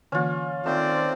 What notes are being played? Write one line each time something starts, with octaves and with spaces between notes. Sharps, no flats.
D3 E3 A#3 C#4 F4
D#3 A3 C4 F4 C5 D5